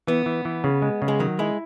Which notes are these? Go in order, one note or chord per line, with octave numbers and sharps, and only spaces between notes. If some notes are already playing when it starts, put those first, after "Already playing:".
E3 B3
E3
E3
C#3
G#3
C#3
G#3
D#3 F#3
G#3 E4